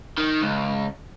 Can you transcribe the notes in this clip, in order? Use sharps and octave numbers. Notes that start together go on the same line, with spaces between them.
D#3
C#2